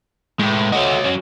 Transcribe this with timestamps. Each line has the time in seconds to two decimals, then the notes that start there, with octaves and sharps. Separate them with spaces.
0.39 A2 G#3 B4
0.73 A3 F#4 C#5 D#5
1.05 F#3 C#4